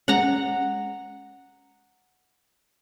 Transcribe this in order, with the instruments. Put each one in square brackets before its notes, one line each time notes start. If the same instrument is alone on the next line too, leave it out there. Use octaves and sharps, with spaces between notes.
[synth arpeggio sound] G#3 C#4 [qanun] F#5 A#5